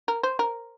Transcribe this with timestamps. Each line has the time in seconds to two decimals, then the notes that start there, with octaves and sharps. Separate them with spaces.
0.08 A#4
0.23 C5
0.39 A#4